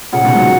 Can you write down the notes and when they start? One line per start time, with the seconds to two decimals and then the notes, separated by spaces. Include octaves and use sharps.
0.12 A#2 C#3 F#5
0.24 B2 D#3
0.35 D#3 F#3